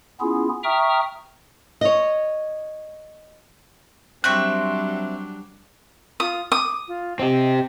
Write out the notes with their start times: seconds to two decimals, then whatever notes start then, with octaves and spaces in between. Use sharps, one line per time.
0.20 B3 C#4 E4 F4 G#4
0.64 E5 G5 A#5 C#6 D#6 F6
1.81 C#5 D#5
4.24 F#3 G3 C4 D4 E5 C#6 F#6
6.20 F4 D#6
6.52 D6 D#6
6.88 F4
7.19 C4 G4 D#5